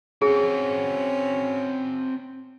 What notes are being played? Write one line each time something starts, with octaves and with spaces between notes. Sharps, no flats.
C4 C#4 F#4 G#4